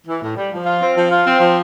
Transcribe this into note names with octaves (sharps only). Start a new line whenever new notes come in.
E3
A2
G3
F3
F4
C4
F3
F4
C4
F3